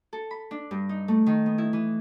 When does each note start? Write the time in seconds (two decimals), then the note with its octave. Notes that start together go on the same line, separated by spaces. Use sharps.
0.13 A4
0.31 B5
0.51 D4
0.71 G2
0.89 D#4
1.08 A3
1.26 D#3
1.46 B3
1.58 E4
1.73 E3